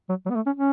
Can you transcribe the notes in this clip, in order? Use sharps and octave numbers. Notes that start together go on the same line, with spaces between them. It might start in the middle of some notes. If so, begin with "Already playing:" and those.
F#3
F#3
B3
A3
C#4
C#4